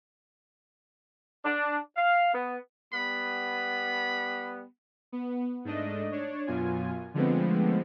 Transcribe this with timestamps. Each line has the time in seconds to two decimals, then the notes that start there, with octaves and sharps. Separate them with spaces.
1.45 D4
1.97 F5
2.34 B3
2.94 G3 B3 B5
5.12 B3
5.65 G#2 A3 D4 D#5
6.11 D4 C#5
6.47 F#2 B2 F4 G#5
7.14 D3 F3 G#3 A3 B3 C4